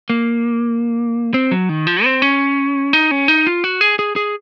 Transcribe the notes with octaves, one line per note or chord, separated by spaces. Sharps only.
A#3
C4
F#3
D#3
F3
C4
C#4
D#4
C#4
D#4
F4
F#4
G#4
G#4
G#4